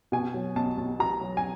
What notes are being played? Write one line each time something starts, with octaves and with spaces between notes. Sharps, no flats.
B2 G#5
F#3
B1 A5
B1
B2 A#5
F#3
G#5